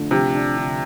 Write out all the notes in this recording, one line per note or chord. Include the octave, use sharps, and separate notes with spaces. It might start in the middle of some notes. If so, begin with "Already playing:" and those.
Already playing: D3 F3 A3 D4
C3 F3
D4
D3